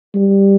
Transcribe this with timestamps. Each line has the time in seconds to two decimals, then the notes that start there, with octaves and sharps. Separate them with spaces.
0.15 G3